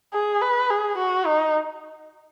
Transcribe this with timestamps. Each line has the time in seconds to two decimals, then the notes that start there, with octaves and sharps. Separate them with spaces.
0.14 G#4
0.41 B4
0.70 G#4
0.98 F#4
1.26 D#4